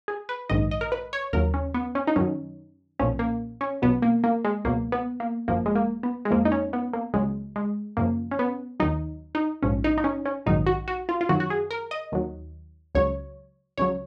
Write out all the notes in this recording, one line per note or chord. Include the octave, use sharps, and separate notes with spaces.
G#4
B4
A#1 G#2 D#3 D#5
D#5
A#4
B4
C#5
D#2 C#3 F#3 A#4
C#4
B3
C#4
D#4
F#2 D#3 F#3 C#4
B1 A#2 F3 C#4
A#3
C#4
B1 B2 F#3 B3
A#3
A#3
G#3
C#2 B2 F#3 A#3
B3
A#3
G#1 F#2 F3 A#3
G#3
A#3
B3
G#3
F2 F3 A#3
D#4
C#4
B3
A#3
C#2 C#3 F#3 G#3
G#3
F#2 C#3 F3 A#3
C#4
B3
D#2 D#3 F#3 D#4
D#4
A#1 G#2 F3 C#4
D#4
D#4
C#4
C#4
A#1 G#2 D#3 F#3 D#4
F#4
F#4
F4
F4
F#2 D#3 F#3 F#4
F#4
G#4
A#4
D#5
D#2 D#3 F#3
C#2 C#3 F#3 C#5
C#2 C#3 F#3 C#5